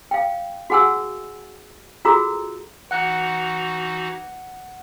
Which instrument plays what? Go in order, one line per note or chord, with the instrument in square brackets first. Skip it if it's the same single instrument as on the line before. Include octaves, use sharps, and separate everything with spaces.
[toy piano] F5 G5
F#4 G#4 F#5 G#5 E6
F4 F#4 G#4 A4 A#5 E6
[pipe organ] E3 D#4 F#4 [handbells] F#5 F#6